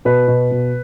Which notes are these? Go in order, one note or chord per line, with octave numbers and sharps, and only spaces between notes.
B2 B4
B2
B2